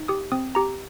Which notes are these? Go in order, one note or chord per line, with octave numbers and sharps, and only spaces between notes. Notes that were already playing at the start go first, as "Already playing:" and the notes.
Already playing: D#4
G4 D#6
C4 D#6
G4 A#5